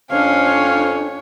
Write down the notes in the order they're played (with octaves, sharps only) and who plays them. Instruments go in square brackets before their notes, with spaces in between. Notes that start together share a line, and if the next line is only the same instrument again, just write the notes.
[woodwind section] F2 [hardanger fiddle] C#4 [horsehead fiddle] D4 C#5 [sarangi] F5